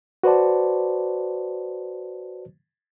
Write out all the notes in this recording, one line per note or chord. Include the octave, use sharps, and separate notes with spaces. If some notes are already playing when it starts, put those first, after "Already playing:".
F#4 B4 C5 D5 A5